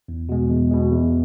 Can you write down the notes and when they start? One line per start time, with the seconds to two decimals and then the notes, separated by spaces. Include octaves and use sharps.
0.08 E2
0.29 B2 G#3
0.50 E2
0.71 B2 G#3
0.91 E2